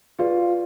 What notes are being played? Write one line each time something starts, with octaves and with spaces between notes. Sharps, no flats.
F4 G#4 B4 D5